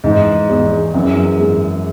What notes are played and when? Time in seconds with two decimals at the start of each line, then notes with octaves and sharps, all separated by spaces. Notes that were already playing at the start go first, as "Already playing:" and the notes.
0.04 G#2 E3
0.49 E2
0.94 F#2 E3
1.40 G#2